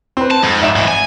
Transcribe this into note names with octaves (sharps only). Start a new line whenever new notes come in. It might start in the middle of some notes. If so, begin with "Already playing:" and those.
C4 B4
A5
F2 G#2
G#1 E5 E7
G#2 E3
G#5